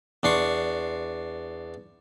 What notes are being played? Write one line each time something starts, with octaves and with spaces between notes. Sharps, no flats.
E2 D4 C6 C#6